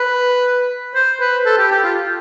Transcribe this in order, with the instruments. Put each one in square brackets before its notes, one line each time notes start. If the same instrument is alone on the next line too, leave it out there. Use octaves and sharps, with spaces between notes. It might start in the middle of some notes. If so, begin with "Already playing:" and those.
Already playing: [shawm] B4
C5
B4
A4
G4
G4
F4